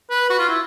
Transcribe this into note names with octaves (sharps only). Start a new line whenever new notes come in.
B4
F#4
F4
E4